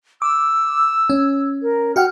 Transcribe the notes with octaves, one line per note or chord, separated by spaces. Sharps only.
D6 E6
C#4
A#4
F#4 F#5 G5 F6